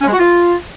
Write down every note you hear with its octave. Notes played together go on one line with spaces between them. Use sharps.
C#4
G#3
F#4
F4